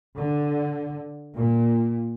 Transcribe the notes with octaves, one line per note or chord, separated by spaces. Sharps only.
D3
A#2